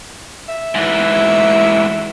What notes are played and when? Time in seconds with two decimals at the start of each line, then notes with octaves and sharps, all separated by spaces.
0.49 E5
0.75 G#2 E3